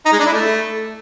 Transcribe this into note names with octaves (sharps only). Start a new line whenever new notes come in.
D#4
G#3
D4
E4
A3